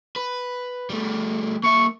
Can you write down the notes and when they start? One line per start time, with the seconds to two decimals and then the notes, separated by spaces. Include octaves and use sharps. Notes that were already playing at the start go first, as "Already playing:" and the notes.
0.16 B4
0.90 G3 A3
1.63 A#3 E5 C#6